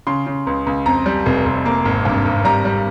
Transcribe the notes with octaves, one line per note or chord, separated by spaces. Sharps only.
C#3 C6
C#3
C#2
C#2
F2 A#5
G3
F1
F1
A#3
G#1
G2
G#1
G3 A#5
G3